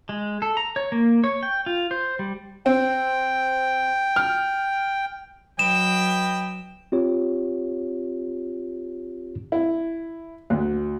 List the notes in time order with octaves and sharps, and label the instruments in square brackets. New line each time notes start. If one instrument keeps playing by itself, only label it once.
[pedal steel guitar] G#3
A4
A#5
C#5
A#3
C#5
G5
F4
C5
G3
[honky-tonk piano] C4 [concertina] G5
[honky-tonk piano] F6
[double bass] F#3 [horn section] B4 D#5 G5 [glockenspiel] E7
[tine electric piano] C4 F4 G4 C#5
[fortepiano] E4
D2